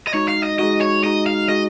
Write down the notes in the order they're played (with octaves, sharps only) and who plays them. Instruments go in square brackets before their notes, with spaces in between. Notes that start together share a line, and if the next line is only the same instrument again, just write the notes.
[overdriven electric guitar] D#5
[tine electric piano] G#3 D#4 F#4 [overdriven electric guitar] C#5
[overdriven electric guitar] F5
D#5
[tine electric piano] G#3 D#4 F#4 [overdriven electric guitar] D#5
[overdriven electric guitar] C#5
[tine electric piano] G#3 D#4 F#4 [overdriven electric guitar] D#5
[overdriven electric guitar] F5
[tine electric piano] G#3 D#4 F#4 [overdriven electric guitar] D#5